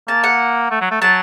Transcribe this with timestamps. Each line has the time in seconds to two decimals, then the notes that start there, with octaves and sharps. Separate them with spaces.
0.08 A#3 A5
0.24 F#5
0.71 A3
0.81 F#3
0.91 A3
1.02 F#3 A5